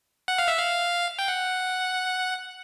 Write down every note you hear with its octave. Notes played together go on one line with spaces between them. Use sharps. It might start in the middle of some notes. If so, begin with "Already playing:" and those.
F#5
F5
E5
F5
G5
F#5